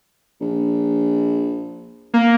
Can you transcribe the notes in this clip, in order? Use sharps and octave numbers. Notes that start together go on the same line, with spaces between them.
A#1
A#3